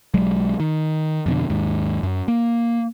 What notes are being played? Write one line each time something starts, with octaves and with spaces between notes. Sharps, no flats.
B1 F#3 G#3
D#3
F2 B2 D3
D#2 G#2
F#2
A#3